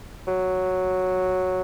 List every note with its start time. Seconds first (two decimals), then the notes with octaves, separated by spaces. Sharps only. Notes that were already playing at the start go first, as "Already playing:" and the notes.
0.27 F#3